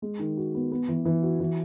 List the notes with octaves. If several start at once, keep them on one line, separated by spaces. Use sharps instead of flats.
G#3
D#3
F#4
B3
B3
E3
E3
F#4
E3